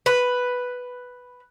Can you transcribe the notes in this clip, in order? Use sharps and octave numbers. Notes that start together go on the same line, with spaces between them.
B4